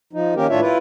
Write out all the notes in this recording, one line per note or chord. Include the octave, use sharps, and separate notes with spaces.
F3 D#4
D#3 A#3 C#4 G4 A#4
A2 D4 F4 C#5 E5
E4 F4 B4